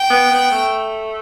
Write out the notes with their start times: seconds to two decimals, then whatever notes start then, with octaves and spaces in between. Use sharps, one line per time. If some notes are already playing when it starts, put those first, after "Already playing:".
Already playing: G5
0.10 B3
0.31 B3
0.51 A3